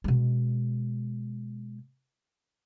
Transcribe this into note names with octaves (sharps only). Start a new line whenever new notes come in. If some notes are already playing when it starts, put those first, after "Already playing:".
B2 G#3